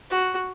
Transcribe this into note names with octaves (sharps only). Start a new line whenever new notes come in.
F#4